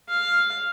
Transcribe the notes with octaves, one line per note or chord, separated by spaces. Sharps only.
F5